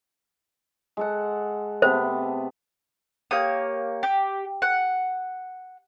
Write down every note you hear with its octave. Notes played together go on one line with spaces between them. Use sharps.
G#3 A4 F#5
C3 A3 B3 C5
A#3 G4 C#5 D#6
G4
F#5